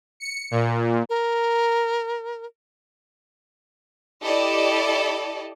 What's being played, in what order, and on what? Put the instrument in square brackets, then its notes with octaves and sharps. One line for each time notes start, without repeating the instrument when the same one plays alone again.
[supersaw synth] C#7
A#2
[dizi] A#4
[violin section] E4 G4 A4 D5 D#5